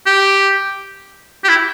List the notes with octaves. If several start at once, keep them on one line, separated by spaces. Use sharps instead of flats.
G4
G4
E4